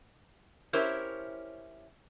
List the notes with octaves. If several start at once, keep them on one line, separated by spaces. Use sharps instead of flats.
C#4 E4 G4 A#4 C5 C#5